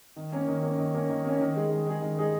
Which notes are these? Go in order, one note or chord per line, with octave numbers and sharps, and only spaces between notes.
D#3
A#3 C#4
D#3
A#3 C#4
D#3
A#3 C#4
D#3
A#3 C#4
D#3
G#3 D#4 G#4
D#3
G#3 D#4 G#4
D#3
G#3 D#4 G#4